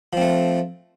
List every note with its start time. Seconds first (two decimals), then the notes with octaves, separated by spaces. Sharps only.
0.13 F3
0.17 C4
0.21 A3